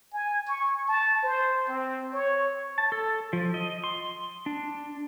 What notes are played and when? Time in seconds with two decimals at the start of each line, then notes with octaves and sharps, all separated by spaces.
0.13 G#5
0.48 C#6
0.88 A5
1.23 C5
1.68 C4
2.13 C#5
2.78 A5
2.92 A4
3.33 F3
3.54 D#5
3.84 C6
4.46 D4